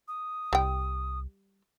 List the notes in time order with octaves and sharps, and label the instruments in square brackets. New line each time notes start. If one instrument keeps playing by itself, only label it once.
[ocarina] D#6
[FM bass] C2 [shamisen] G3 G5